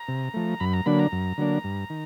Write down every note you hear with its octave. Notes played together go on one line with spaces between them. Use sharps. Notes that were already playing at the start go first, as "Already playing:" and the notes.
Already playing: A#5
C3
F3 A3
F#2 B5
A#5
D3 F#3 A#3 D4 B5
A#5
F#2
D3 F#3 A#3 D4
G2
D#3